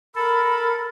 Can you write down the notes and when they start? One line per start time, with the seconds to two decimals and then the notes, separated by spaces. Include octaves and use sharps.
0.15 A4 A#4 B5